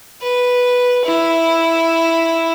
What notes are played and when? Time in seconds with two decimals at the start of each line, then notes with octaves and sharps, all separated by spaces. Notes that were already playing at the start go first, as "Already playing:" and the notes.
0.22 B4
1.06 E4